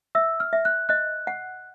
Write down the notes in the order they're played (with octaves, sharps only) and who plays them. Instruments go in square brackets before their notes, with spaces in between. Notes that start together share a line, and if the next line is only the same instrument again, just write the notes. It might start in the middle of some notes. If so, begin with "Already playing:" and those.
[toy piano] E5 [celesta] E6
[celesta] F6
[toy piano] E5
[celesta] F#6
[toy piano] D#5 [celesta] F#6
[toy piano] F#5